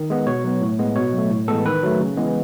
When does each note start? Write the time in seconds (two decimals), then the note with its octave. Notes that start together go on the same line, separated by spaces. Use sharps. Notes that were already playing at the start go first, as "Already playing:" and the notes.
Already playing: D#3
0.10 G#3 B3
0.27 B2 C#5
0.44 F#3 B3
0.61 A2
0.79 G#3 B3
0.96 B2 C#5
1.13 F#3
1.18 A3
1.30 A2
1.48 E3 G#3 B3 A4
1.66 D#3 B4
1.83 F#3 A3
2.00 C#3
2.17 E3 G#3 B3